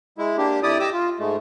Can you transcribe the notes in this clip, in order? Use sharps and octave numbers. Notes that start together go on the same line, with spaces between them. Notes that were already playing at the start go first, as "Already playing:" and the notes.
G#3 E4
A#3 D4 G4
F2 E4 G4 D5 D#6
G4 D#5 D6 E6
F4
G#2 G#3 A3